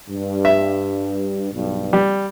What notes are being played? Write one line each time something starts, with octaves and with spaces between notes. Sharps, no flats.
G2
E5
B1 G2
G3